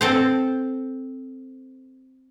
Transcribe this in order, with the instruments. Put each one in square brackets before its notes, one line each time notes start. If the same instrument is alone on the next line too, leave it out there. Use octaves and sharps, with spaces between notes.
[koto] C4 A4 C5